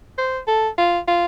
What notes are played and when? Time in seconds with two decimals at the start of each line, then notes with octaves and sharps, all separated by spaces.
0.18 C5
0.48 A4
0.78 F4
1.08 F4